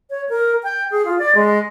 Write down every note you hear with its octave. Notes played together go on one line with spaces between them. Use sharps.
C#5
A#4
G5
G#4
F4
D5
G#3